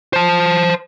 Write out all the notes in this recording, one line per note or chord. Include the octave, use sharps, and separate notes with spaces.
C5 A5